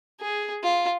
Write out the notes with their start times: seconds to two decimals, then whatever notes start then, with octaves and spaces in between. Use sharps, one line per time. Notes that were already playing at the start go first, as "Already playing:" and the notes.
0.20 G#4
0.63 F4